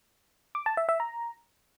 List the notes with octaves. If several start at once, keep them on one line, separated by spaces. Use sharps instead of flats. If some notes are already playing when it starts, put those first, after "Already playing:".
D6
A5
E5
E5
A#5